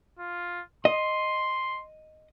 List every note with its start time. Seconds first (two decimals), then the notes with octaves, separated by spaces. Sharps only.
0.19 F4
0.85 D#5 C6